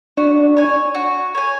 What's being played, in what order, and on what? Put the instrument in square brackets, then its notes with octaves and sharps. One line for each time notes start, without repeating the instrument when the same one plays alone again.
[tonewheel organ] D4 [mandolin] F#4
[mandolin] C#5 G#5
F#4
C#5 G#5